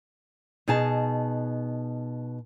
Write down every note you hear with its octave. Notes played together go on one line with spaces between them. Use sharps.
B2 D#4 G#4 A5